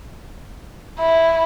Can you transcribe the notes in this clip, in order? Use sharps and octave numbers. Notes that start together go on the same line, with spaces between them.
E4